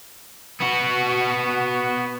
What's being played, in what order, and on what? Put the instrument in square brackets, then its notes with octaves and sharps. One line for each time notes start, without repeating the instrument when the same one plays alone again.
[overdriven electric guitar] B3 F#4